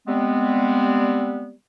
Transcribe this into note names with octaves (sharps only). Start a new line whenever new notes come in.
G3 G#3 B3 C4